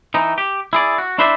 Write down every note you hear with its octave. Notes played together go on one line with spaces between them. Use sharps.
E3 D#4
G4
E4 G#4 D5
F#4
D4 E4 B4 C5 D5 E5